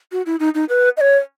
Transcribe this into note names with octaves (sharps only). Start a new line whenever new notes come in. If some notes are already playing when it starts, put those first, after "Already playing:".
F#4
E4
D#4
D#4
B4
D#5
C#5